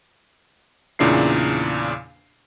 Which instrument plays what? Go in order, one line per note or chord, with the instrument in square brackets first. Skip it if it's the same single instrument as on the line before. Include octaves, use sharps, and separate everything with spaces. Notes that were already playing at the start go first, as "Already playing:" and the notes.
[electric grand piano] E2 A#2 C#3 D4 E4 C7